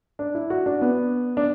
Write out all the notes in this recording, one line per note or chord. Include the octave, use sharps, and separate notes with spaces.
D4
E4
F#4
D4
B3
D4